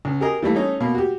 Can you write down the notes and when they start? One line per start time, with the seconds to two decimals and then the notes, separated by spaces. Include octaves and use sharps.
0.05 C#2
0.21 G4 G#4 A#4 D#5
0.42 E3 G3 A3 A#3
0.55 A3 C#4 D#4
0.80 B2 A#3
0.94 F#4 G4